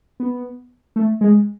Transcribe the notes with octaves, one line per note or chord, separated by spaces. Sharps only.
B3
A3
G#3